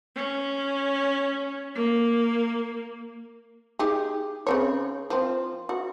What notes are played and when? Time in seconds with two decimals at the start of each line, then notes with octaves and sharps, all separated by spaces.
0.16 C#4
1.75 A#3
3.79 D#4 G4 G#4
4.47 C#3 C4 C#5
5.10 F3 C4
5.69 F#4